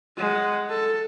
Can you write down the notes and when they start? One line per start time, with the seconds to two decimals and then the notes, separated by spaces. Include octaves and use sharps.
0.17 G#3 F#5
0.69 A4